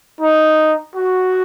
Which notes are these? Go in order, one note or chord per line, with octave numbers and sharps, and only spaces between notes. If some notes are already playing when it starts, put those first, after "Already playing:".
D#4
F#4